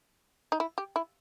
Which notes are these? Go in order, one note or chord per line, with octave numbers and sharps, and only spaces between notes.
D#4
E4
G4
E4